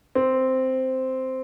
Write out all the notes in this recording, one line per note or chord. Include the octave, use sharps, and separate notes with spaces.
C4